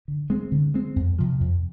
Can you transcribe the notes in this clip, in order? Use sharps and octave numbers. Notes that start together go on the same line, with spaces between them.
D3
G#3 C4
D3
G#3 C4
F2
C3 F3
F2